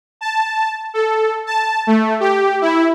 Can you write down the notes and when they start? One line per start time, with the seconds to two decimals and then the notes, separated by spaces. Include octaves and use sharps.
0.21 A5
0.94 A4
1.46 A5
1.87 A3
2.20 G4
2.61 E4